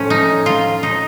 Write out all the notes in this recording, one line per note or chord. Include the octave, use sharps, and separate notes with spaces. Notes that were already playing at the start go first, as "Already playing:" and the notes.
Already playing: A2 F3 A3 C#4
D#4
F4
D#4